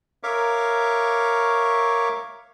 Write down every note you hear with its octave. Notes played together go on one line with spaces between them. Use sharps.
A#4 C#5 E5 F5 C#6 D6